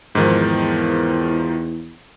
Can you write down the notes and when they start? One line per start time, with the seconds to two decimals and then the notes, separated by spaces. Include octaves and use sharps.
0.15 E2 G#2 D#3 F3